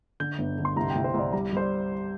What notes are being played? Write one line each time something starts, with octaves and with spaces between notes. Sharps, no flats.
D3 G6
G1
D3
C6
C2 A#5
G5
C2
C5
C2 D5
G3 A#5
G3 C5
D5